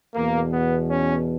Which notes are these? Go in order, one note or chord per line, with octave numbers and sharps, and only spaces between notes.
E2 B2 A#3
B3
C#4